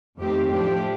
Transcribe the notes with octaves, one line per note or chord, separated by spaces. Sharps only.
F2 D#3 A3 C4 G4
A2 F3 A3 D4 G4